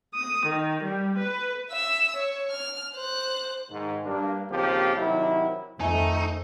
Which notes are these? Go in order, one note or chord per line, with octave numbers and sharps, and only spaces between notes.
D#6
D#3
G3
B4
E5 E6
C#5
F6
C5 F#6
G#2 D#3
G2 A#3 D4
D#2 C#3 F3 A#3 C4 G4
C3 D#3 F#3 E4
F2 D#3 A3 D#4 E5 G#5